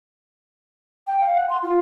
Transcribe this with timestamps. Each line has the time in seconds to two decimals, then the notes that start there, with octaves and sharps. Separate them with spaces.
1.07 G5
1.21 F5
1.35 F#5
1.49 C6
1.63 F4